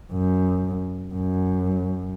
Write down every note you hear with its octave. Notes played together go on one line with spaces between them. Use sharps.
F#2
F#2